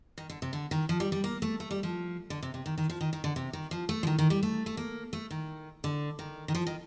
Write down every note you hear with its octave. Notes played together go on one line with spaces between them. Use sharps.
D#3
D3
C3
D3
D#3
F3
G3
G3
A#3
A3
A3
G3
F3
D3
C3
C3
D#3
D#3
F3
D#3
D#3
D3
C3
D#3
F3
A3
F3
D#3
D#3
G3
A3
A3
A#3
A3
D#3
D3
D#3
D#3
F3
D#3